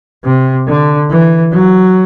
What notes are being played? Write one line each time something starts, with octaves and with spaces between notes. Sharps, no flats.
C3
D3
E3
F#3